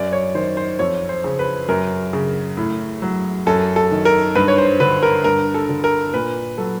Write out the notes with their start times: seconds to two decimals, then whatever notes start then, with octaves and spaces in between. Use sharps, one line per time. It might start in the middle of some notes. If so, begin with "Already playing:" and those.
Already playing: F#2 D5
0.13 C#5
0.35 D#3 C5
0.57 C5
0.79 F2 C#5
1.09 C5
1.24 C#3
1.39 B4
1.69 F#2 A#4
2.13 C#3
2.57 A2
3.02 F#3
3.47 F#2 A4
3.76 A4
3.91 D#3
4.05 A#4
4.35 G2 B4
4.48 C#5
4.58 C5
4.80 D3 B4
5.03 A#4
5.24 G2 A#4
5.54 A4
5.69 D3
5.84 A#4
6.14 A#2 B4
6.58 F#3 A4